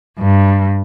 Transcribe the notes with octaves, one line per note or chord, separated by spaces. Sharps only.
G2